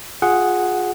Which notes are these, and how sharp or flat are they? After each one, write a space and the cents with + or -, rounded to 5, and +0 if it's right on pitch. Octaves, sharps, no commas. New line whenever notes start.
F4 +20 G#4 +0 F#5 +0